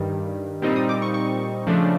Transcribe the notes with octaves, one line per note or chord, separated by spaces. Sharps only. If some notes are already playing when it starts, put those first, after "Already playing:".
Already playing: G2 D#3 G3
A#2 G3 C4 D#4
D#6
D6
C#6
C#6
C#3 F3 A3 D4